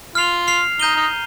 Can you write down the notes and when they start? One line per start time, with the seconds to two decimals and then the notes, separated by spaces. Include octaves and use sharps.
0.15 F4 F6 C7 F7
0.47 F6 C7 F7
0.80 D#4 A#5 G6 D#7 G7
0.95 D#4